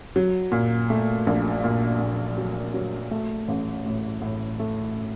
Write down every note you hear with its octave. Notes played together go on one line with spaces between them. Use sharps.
F#3
A#2
A3
A#1
A#2
A#2
F#3
F#3
A3
A1
A2
A2
A3